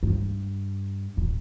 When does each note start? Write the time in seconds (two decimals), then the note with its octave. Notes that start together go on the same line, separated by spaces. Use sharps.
0.03 G2
1.17 D1